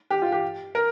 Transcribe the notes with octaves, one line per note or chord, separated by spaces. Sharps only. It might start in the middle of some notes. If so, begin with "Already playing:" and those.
G4
F4
G4
A#4